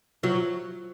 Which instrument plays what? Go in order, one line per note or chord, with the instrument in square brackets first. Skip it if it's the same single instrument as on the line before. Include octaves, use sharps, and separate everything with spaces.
[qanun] F3 [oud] F#3